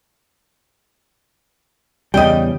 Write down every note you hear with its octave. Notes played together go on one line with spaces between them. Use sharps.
E2 C#3 G3 D#5 G5